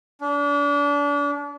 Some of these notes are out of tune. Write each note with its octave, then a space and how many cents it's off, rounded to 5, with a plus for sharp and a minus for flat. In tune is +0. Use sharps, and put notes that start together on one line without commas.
D4 -35